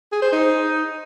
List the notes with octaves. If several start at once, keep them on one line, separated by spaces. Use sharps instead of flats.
G#4
C5
D#4